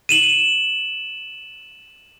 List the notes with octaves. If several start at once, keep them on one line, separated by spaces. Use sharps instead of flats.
D#7 E7 F#7